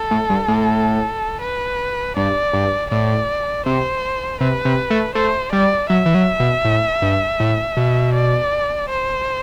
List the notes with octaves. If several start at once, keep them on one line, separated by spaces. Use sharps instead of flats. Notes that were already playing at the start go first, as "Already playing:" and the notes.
Already playing: A4
A2
G2
A2
B4
G2 D5
G2
A2 D5
C3 C5
C3 B4
C3
A3
A3 C5
G3 D5
F#3 E5
E3
F#3
B2
A2
G2
A2
B2
D5
C5